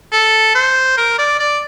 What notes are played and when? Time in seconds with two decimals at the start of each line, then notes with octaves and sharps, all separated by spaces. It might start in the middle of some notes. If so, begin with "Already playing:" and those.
0.12 A4
0.55 C5
0.98 A#4
1.19 D5
1.39 D5